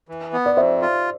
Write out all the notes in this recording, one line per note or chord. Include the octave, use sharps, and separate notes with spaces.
E3
B3
D5
F2 C5 E5
F4